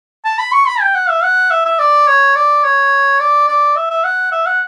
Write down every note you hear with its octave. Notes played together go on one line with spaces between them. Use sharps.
A5
B5
C#6
B5
G5
F#5
E5
F#5
E5
E5
D5
C#5
D5
C#5
D5
D5
E5
E5
F#5
E5
F#5